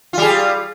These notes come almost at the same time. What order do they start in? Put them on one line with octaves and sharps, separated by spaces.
F4 G3 G#4